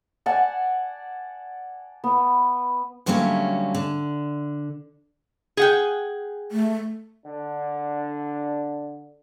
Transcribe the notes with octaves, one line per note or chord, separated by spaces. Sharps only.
D5 F#5 G#5 A5
B3
D3 F#3 G3 A3 A#3 C#4
D3
G#4 F#5 G5
A3
D3 D4